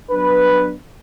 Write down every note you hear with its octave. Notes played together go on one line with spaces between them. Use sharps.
F#3 B3 D4 B4